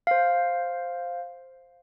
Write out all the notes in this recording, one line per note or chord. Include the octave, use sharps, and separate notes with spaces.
C5 F5